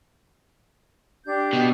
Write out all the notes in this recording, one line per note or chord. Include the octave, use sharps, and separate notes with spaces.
D4 G4 G6
B2